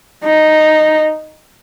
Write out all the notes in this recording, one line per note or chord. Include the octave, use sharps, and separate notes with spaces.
D#4